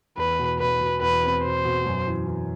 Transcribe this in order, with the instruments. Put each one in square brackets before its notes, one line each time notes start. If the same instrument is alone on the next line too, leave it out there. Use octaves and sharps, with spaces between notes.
[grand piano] E2 [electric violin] B4
[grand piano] B2
[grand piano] B2 [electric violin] B4
[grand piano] B2
[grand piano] E2 [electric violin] B4
[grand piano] C4
[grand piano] B2 [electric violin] C5
[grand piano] B2
F#2
E3
E3